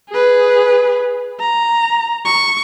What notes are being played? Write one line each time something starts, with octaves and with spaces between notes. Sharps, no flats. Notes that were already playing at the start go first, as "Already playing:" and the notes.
G#4 B4
A#5
C#6